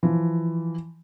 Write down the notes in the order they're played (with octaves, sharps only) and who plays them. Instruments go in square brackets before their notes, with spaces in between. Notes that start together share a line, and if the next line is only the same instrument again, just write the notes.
[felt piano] E3 F3